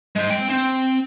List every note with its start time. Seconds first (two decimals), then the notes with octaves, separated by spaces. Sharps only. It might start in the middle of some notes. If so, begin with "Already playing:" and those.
0.16 G#3 C5
0.31 C4 G5
0.50 C4